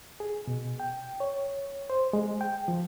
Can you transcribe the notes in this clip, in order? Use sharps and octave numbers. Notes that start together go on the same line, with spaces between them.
G#4
B2
G5
C#5
C5
G#3
G5
F3